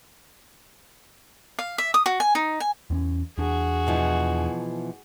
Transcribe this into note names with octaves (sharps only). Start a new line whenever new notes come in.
F5
E5
D#6
F#4
G#5
D#4
G#5
E2 C4 C#4
E2 D4 F#4 G#4
B2 E3 F3